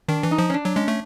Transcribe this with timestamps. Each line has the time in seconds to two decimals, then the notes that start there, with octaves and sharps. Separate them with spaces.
0.08 D#3 D4
0.23 E3
0.31 D#4
0.38 F3
0.50 C#4
0.54 D4
0.65 F#3
0.76 G#3 C#4
0.88 A3